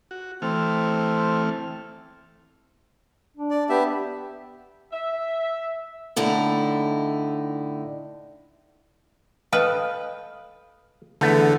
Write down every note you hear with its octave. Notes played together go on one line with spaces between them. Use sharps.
F#4
E3 A3 C4 F6
D4
D5
B3 G4 E5
E5
A2 D3 D#4 E4
A4 B4 D#5 F5 G5
E2 D3 A3 B3